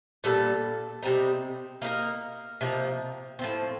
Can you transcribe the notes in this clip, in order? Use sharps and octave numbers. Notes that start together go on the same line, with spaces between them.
A#2 G3 D4 A4
C3 G3 C4 D#4
A#3 D#4 G4 A#4
C3 F3 A#3 D#4
A2 F3 C4